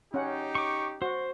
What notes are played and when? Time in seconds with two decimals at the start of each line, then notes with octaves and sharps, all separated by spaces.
0.14 C#4 D#4 G4 F#5
0.55 C#6 D6
1.02 F#4 C5